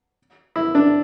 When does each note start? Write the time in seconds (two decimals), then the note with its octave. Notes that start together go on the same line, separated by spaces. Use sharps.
0.56 E4
0.75 D4